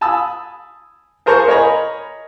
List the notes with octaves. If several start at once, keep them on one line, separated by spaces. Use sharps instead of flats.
G#5 A5 B5 D#6 E6
G#4 A#4 C5 A5 A#5 C#6
A#4 C#5 D#5 G#5 A#5 B5